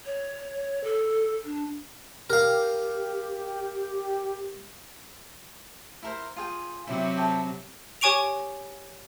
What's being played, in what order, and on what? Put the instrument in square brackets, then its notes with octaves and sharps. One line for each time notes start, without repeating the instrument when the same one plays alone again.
[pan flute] C#5
A4
D4
[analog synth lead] G4 [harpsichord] A#4 F5
[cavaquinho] E4 A#4 C5
F4 G#4 G5
[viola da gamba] C3 F#3 C4 [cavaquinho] E4 D5 E5
[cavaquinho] E4 A4 G5
[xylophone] G4 C#5 G#5 C#6 D7 F7